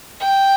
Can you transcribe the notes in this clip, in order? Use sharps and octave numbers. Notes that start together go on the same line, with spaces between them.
G5